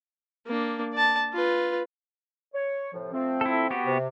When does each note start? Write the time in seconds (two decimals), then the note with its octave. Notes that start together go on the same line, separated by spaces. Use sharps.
0.46 A#3 D4
0.93 D5 A5
1.34 F4 B4
2.55 C#5
2.93 A2 C3 F3
3.13 F3 A3 C4
3.41 E4 A4
3.70 B3 F#4 G4
3.86 C3